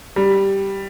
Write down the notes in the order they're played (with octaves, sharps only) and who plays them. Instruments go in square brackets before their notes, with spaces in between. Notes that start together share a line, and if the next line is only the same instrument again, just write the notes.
[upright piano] G3